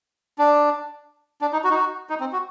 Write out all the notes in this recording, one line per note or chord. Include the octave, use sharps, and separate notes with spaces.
D4
D4
D#4
F#4
D#4
F#4
D#4
C4
F#4